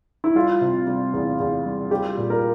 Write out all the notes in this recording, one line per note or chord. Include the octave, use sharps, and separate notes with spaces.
E4
G3 F4
C3
G3
E2
E2
G3
G3 G4
A#2
A#4